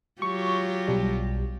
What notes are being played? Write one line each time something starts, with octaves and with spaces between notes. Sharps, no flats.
F#3 F4 G4 C#6
B1 G3